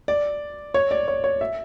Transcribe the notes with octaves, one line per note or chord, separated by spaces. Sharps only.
D5
C#5
D5
C#5
C#5
E5